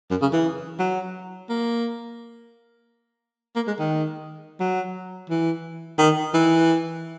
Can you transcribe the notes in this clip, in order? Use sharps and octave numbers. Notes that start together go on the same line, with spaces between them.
F#2
C#3
E3
F#3
A#3
A#3
G#3
D#3
F#3
E3
D#3
E3